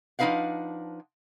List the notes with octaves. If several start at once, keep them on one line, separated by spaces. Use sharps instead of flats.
F3 D4 D#4 B4 F5 F#5